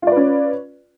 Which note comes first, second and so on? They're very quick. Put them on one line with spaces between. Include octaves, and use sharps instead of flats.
F4 D5 B4 C#4